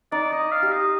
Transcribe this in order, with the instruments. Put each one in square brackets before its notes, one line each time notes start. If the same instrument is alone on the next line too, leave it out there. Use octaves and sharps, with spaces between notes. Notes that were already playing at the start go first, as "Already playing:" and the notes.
[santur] D#4 [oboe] D5
[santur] D#4 [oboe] D#5
[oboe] F5
[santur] G4
[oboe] D#5